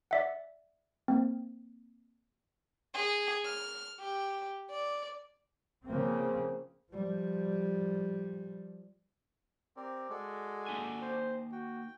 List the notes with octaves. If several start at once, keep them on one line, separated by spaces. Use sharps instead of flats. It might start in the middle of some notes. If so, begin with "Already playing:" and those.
D5 E5 F#5
A#3 C4
G#4
F6
G4
D5
C#3 F3 A#3 C4
F3 G3
C4 G4 A#4 D5
G#3 F#4 A4 D5
A#3 D#4 G#5
C5
F#4 G5